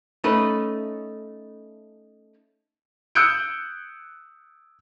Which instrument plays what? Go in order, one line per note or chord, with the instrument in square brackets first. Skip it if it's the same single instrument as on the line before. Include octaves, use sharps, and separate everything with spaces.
[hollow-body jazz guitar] A3 C#4 D#4 B4
[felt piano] D#6 E6 F#6 G6 C#7 D7